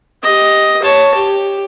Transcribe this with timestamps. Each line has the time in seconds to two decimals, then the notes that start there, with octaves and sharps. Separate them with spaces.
0.23 G4 D#5
0.82 C#5 A5
1.15 G4